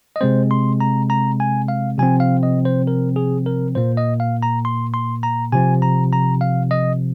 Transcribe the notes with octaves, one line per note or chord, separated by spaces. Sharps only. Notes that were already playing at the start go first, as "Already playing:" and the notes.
D#5
C3 G#3 C4 C5
C6
A#5
A#5
G#5
F5
C3 F3 C4 G#5
F5
D#5
C5
A#4
G#4
A#4
A#2 A#3 C5
D#5
F5
A#5
C6
C6
A#5
C3 F3 C4 G#5
A#5
A#5
F5
D#5